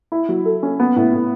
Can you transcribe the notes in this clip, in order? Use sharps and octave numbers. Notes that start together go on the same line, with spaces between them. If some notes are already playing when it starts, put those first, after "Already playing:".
E4
F#3
A4
C#4
B3
A2
A2